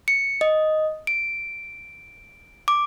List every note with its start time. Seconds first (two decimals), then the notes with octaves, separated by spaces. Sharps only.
0.08 C#7
0.41 D#5
1.07 D7
2.68 D6